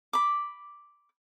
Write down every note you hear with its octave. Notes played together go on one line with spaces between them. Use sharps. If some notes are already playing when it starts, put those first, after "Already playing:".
B5 D6